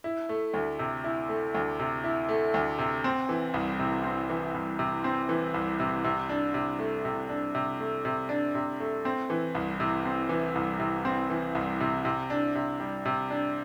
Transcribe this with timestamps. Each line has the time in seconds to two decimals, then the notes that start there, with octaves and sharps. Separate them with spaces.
0.04 E4
0.29 A3
0.54 D2
0.79 C3
1.04 E4
1.29 A3
1.55 D2
1.79 C3
2.04 E4
2.29 A3
2.54 D2
2.79 C3
3.04 C4
3.29 E3
3.54 C2
3.79 C3
4.04 C4
4.30 E3
4.54 C2
4.79 C3
5.04 C4
5.29 E3
5.54 C2
5.80 C3
6.04 C3
6.29 D4
6.54 C3
6.79 A3
7.05 C3
7.29 D4
7.55 C3
7.80 A3
8.05 C3
8.29 D4
8.55 C3
8.80 A3
9.05 C4
9.30 E3
9.55 C2
9.80 C3
10.05 C4
10.29 E3
10.55 C2
10.80 C3
11.05 C4
11.30 E3
11.55 C2
11.80 C3
12.05 C3
12.30 D4
12.55 C3
12.80 G3
13.06 C3
13.30 D4